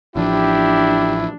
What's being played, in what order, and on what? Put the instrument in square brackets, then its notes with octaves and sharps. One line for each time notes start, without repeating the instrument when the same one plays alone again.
[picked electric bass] A1 F3 [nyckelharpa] D4 [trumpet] E4 [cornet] G4